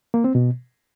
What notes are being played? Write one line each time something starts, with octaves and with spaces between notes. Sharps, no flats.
A#3
C4
B2